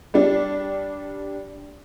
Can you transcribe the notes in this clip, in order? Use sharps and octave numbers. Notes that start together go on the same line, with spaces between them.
G3 D4